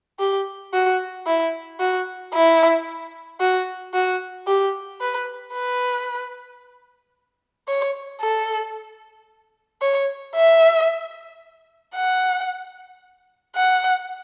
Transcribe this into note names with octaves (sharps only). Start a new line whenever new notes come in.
G4
F#4
E4
F#4
E4
F#4
F#4
G4
B4
B4
C#5
A4
C#5
E5
F#5
F#5